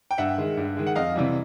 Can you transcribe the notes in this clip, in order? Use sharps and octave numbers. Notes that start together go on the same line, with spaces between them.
G5
G2 E5 F#5
D#3 G#3
G2
D#3 G#3
F#5
F2 D#5 F5
C3 E3 G3